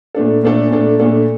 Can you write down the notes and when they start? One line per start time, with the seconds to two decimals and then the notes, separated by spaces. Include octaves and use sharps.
0.15 A#2 A3 D4 A4
0.43 A#2 A3 D4 A4
0.70 A#2 A3 D4 A4
1.00 A#2 A3 D4 A4